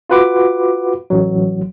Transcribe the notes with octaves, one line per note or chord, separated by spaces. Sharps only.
F4 F#4 B4 F#5 D6
A1 F#3